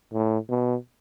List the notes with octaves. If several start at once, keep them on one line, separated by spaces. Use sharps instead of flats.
A2
B2